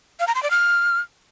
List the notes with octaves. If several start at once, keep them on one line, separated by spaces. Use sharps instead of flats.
F5
A#5
C6
D5
F6